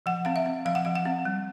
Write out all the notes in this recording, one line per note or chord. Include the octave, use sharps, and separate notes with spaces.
F3 F#5
C4 F5
E5
C4
F3 F5
F#5
F3 F5
F#5
C4
G3